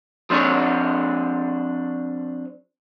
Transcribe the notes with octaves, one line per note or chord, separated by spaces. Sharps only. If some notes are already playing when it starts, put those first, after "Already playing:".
F3 C4 D4 G#4 C#5